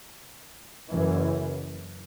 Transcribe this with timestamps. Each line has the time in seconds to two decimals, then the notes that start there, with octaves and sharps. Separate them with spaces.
0.89 F#1 F#2 E3